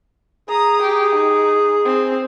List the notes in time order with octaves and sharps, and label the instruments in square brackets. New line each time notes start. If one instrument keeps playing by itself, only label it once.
[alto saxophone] G#4 [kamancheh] A#5 D#6
[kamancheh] G4
D#4
C4